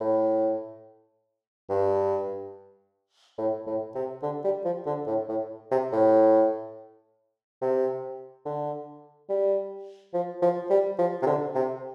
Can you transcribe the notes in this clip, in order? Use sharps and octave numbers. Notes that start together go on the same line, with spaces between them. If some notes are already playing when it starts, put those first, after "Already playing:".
A2
G2
A2
A2
C3
D3
G3
F3
D3
A2
A2
C3
A2
C3
D3
G3
F3
F3
G3
F3
C3
D3
C3